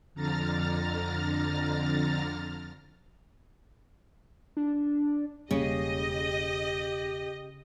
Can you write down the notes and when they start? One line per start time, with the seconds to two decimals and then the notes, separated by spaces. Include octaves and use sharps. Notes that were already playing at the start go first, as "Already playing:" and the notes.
0.14 F2 D3 A#5 F6 A6
4.57 D4
5.51 E1 C#3 G3 A#3 G4 D#5